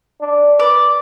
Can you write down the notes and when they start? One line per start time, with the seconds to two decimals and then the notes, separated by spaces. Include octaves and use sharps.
0.20 D4
0.59 B4 D5